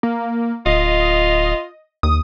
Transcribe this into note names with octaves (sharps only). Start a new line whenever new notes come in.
A#3
D1 F4 D#5
D#2 D#6